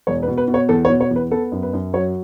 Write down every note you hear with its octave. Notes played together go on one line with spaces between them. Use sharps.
E1 C#5
B4
B2
B4
B2
C#5
E2 A4
C#5
B2
C#5
E2
B4
B3 A4
F#2
B4
F#2
F#3 C#5